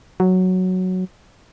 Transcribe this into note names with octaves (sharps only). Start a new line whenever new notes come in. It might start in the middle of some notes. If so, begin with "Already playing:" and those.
F#3